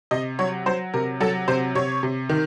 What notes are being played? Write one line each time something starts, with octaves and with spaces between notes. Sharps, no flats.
C3 D#5
F#3 C#5
F#3 C5
C3 A#4
F#3 A4
C3 C5
C3 C#5
C3
D#3